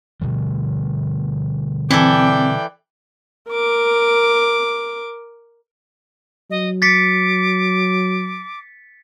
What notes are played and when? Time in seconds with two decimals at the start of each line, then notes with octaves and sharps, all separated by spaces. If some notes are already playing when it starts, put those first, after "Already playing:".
0.21 B2 D3 G3
1.90 E3 C4 A4 D5 G5
3.50 A#4 D6
6.50 F#3 D#5
6.82 D6 A6 B6 C#7